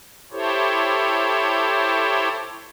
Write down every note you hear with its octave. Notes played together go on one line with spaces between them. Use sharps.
E4 G4 A4 C5 C#5